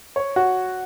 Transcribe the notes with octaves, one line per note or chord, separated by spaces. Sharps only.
C#5
F#4